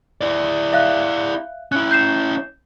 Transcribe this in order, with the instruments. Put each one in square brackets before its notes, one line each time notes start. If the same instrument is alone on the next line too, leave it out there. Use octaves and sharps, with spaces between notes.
[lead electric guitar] E4 D5
[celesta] E5 F5 F#6
[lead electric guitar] C#4 E4 [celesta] F#6
[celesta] G6 C7 E7